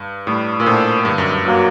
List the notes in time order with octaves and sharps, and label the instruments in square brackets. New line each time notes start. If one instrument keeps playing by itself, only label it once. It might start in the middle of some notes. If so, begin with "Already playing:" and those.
Already playing: [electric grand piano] G2
[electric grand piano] A2 [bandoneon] G3
[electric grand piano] A#2
[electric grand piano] A2 [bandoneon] D4 A4 C5
[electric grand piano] G2 [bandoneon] D3
[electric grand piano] F#2
G2
[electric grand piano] G2 [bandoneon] F#3 A#3 F#4